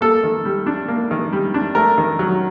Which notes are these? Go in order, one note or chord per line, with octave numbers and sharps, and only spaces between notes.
A#3 A4
D#3
G3
D4
A#3
D#3
G3
D4
A3 A#4
D#3
F#3